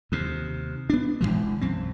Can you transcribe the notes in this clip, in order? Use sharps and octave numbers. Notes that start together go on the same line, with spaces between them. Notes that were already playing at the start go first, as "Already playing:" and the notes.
D#2 C3
B3 D4
E1 G#2 E3 G#3
B1 F#2 C4